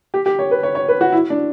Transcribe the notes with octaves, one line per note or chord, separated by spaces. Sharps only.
G4
G4
C#5
B4
C#5
C#5
B4
F#4
E4
D4